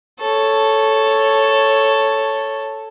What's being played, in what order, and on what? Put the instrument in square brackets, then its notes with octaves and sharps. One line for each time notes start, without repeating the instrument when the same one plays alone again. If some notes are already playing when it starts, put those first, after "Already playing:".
[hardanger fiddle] A4 C#5